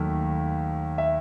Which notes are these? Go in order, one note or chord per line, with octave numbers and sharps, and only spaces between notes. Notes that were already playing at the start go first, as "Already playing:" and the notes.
Already playing: D#2 D#3 F#3 A3
E5